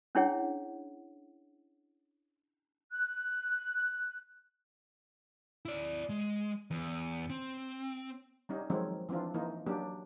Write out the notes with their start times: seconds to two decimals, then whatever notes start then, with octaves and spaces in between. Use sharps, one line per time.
0.15 C#4 D4 E4 G#4 C#5 F#5
2.92 F#6
5.65 E4 D5
6.09 G#3
6.71 E2
7.30 C4
8.49 G3 C#4 D#4
8.70 D#3 F3 F#3 G#3 C4 C#4
9.09 E3 F3 C4 D4 F4
9.34 E3 A#3 D#4 F4
9.67 F#3 A#3 C#4 D4 G4